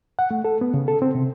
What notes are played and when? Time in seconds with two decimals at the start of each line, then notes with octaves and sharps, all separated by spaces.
0.19 F#5
0.31 A3
0.45 A4
0.61 B3
0.74 C#3
0.88 A4
1.02 C4
1.15 C3